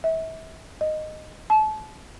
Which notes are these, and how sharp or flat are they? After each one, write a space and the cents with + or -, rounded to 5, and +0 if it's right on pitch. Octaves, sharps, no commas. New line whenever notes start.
E5 -35
D#5 -5
A5 -30